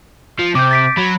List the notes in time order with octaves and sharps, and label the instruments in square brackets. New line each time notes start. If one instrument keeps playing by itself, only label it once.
[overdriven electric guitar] F3
[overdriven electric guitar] C3 [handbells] D6 G6
[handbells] A6 B6 D7
[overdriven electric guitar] F#3 [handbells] B5